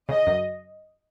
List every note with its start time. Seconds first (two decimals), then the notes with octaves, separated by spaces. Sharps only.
0.09 C#3 D#5
0.27 F#2